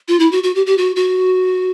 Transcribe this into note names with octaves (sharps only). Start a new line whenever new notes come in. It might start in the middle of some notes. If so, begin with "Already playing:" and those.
F4
E4
F#4
F#4
G4
G4
F#4
F#4